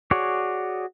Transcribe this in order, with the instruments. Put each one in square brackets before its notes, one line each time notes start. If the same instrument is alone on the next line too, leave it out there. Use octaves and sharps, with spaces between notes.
[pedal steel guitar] F#4 G#4 C#5 D5